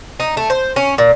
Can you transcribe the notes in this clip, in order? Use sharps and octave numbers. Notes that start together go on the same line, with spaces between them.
D#4
A3
C5
C#4
A#2